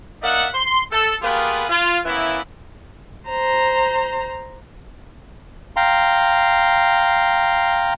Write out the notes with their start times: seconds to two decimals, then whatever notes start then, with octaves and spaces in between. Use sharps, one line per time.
0.23 A#3 D#4 D5 E5 F#5
0.54 C6
0.92 A4
1.22 A#3 B3 F4 G4 G#4 B4
1.69 F4
2.05 E3 A#3 B3 C#4 E4
3.29 C5 A#5
5.76 F5 G5 A#5 C6